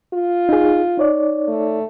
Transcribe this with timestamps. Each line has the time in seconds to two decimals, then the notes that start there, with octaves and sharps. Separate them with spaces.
0.13 F4
0.49 D#4 G#4
0.98 D#4 C#5 D5
1.48 A3